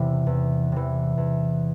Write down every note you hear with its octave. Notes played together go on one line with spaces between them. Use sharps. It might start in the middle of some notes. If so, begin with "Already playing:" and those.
Already playing: E2 C3 E3
E2
C3 E3
E2